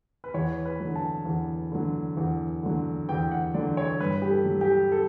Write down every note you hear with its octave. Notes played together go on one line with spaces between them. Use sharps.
B4
E2 C#5
B4
D3 F#3
A5
E2
D3 F#3
E2
D3 F#3
E2 G5
F#5
D3 F#3 D5
C#5
G2 B4
G4
A4
F#3
G4
A4